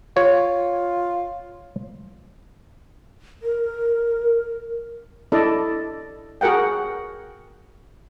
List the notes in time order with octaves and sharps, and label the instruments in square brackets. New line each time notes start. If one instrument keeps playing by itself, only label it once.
[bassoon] F4 [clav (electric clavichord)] C#5
[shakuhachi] A#4
[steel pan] D4 E4 A4 D5 D#5
F#4 G#4 A#4 F#5 G5